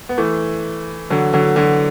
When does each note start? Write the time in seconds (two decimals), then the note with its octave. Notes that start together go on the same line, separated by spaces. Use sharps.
0.09 B3
0.18 E3 A3
1.10 D3 F#3
1.34 D3 F#3
1.56 D3 F#3